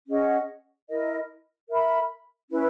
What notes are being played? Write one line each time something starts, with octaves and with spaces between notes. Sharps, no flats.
C#4 G#4 D#5 F#5
E4 A#4 D#5
A#4 E5 B5
C#4 E4 B4